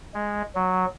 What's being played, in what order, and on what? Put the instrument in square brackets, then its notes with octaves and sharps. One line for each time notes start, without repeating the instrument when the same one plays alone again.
[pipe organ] G#3
F#3